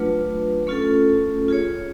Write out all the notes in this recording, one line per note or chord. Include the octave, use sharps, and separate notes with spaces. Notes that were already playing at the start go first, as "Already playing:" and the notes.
Already playing: F#3 A3 D4 F4 B4
A3 C#4 F4 A4
F4 G#4 C#5